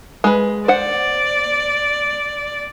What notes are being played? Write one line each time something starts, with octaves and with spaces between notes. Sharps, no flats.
G#3 B4
C5 D5 F#5